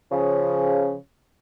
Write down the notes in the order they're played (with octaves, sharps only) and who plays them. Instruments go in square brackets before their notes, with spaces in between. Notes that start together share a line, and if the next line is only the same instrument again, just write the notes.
[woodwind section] C#3 F3